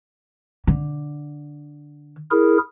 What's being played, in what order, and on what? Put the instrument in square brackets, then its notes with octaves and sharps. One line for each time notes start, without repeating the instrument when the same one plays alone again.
[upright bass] D3
[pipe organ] E4 G#4 A#4